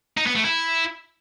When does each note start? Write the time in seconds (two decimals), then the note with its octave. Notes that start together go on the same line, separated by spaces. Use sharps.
0.18 D#4
0.27 B3
0.36 A3
0.45 E4